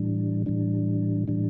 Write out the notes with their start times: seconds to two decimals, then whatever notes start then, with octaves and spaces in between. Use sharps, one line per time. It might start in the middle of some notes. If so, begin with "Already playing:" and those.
Already playing: A2 E3 G3 D4
0.46 A2 E3 G3 D4
1.28 A2 E3 G3 D4